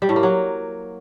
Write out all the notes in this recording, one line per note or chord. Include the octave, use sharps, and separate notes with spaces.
G3
A2
A#3
F#3